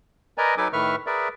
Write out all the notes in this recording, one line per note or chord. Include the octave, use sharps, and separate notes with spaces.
A#4 B4 D5 D#5 G#5 A#5
F#3 D#4 A4 B4 G#5 D6
A2 D#3 B4 E5 C#6 F6
G#4 A#4 B4 D5 E5